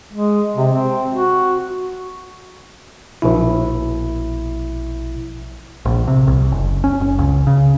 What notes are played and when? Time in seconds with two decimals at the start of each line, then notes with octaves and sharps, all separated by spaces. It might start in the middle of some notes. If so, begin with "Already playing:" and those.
0.13 G#3
0.56 C3
0.73 C4
1.11 F#4
3.22 A#1 B2 E4
5.85 A#1
6.08 C3
6.27 C2
6.51 F#1
6.84 C#4
7.00 F#1
7.19 C#2
7.47 C#3